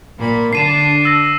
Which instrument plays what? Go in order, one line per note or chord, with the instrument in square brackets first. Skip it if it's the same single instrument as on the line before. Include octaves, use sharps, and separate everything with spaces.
[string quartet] A#2 A#3 B5
[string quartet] D3 D4 A5 [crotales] C7 D#7 E7
[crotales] E6 A#6